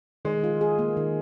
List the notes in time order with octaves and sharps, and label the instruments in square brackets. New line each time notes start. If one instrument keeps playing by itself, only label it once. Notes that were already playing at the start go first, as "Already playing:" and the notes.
[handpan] D#3 [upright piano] G#3
[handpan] F4
G#4
A#3
D#3